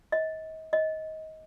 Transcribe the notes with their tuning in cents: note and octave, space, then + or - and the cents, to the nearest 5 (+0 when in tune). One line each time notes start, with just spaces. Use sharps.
D#5 +35
D#5 +20